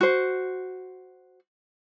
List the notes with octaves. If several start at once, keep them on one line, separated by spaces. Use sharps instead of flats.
F#4 C5